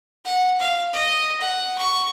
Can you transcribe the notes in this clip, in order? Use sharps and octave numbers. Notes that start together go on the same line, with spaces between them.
F#5
F5
D#5
F#5
C#6